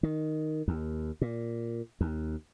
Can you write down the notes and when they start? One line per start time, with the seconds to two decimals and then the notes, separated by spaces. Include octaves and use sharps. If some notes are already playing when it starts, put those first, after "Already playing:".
0.03 D#3
0.68 D#2
1.21 A#2
2.01 D#2